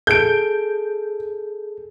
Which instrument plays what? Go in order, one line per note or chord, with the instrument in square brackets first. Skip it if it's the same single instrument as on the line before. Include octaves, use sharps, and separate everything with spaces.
[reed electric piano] G#4 A4 [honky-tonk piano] G6 D7